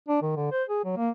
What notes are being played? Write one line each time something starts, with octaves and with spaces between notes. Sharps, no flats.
D4
D#3
D3
C5
G#4
F#3
A#3